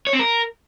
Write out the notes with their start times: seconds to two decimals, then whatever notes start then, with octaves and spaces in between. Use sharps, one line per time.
0.07 C#5
0.13 C4
0.19 A#4